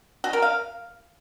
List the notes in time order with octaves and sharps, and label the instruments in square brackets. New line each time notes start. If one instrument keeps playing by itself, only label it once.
[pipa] F#4
A#4
F5